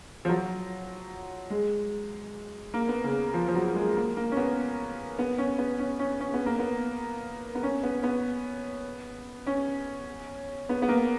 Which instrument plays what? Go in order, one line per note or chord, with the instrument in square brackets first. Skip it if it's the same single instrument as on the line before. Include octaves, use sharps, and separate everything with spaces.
[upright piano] F3
F#3
G#3
A#3
B3
C#3
F3
F3
F#3
G#3
A#3
A#3
C#4
B3
B3
C#4
B3
C#4
C#4
C#4
B3
A#3
B3
B3
C#4
B3
B3
C#4
B3
B3
A#3